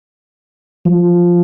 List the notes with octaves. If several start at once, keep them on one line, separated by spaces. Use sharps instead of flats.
F3